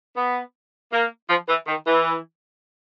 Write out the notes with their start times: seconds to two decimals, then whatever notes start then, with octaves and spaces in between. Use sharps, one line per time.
0.16 B3
0.92 A#3
1.29 F3
1.48 E3
1.67 D#3
1.86 E3